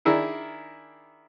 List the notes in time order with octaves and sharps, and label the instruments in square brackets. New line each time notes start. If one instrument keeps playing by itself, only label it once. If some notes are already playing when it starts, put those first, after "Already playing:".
[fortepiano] D#3 D4 E4 G#4 A#4